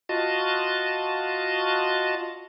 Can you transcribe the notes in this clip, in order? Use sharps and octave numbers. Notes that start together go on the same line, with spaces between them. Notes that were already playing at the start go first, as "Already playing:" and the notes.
F4 F#4 D#5 A5